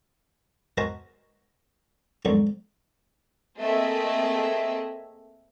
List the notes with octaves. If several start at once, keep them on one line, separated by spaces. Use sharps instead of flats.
F#4 A#4 C5 D#5 G#5 A5
F2 G#2 D3 D#3 F3 F#3
A3 A#3 C4 G#4 D#5 E5